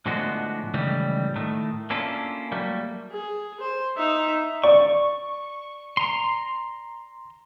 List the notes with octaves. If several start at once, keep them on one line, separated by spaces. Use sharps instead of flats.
A2 D3 F3 G#3 B3 F#4
C#2 A2 D#3 E3 G3
A2 D#3 A3
A#3 C#4 D4 E4 F4 A4
F#3 G3 A3 A#3
G#4
C5
D#4 E5
D5 C#6
A#5 C6